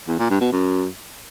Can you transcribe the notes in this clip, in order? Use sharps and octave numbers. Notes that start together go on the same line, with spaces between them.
E2
A#2
G2
B2
F#2